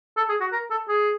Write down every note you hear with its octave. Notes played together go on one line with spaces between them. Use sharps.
A4
G#4
F#4
A#4
A4
G#4